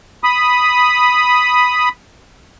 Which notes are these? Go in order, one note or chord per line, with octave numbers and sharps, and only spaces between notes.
B5 D#6